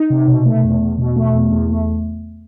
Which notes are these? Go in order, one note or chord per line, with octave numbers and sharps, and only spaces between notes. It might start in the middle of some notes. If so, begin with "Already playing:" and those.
Already playing: D#4
C3
B2
A3
E2
E2
B2
A3
E2
E2
A3